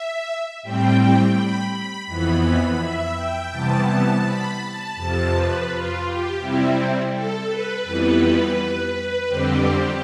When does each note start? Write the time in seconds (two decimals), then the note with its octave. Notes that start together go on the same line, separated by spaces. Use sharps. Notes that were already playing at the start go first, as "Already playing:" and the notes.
Already playing: E5
0.63 A2 G3 C4 G5
1.35 B5
1.70 B5
2.07 F2 E3 B3 B5
2.79 E5
3.15 G5
3.50 C3 E3 G3 B3 A5
4.23 B5
4.59 A5
4.95 F2 C3 F3 A5
5.31 B4
5.67 F4
6.03 G4
6.39 C3 G3 C4 E4
7.11 A4
7.47 B4
7.83 F2 E3 G3 B3
8.92 B4
9.27 F2 D3 G3 C4 G4